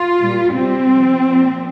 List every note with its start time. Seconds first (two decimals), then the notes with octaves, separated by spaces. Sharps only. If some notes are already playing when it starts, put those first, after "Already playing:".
Already playing: F4
0.19 A#2 G3
0.54 C3 G3 C4
0.90 C3 F3
1.24 A#2 F3